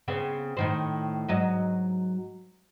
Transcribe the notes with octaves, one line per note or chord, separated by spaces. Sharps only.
C#3 B3 C4
A2 D#3 C5
G#2 F#3 D#5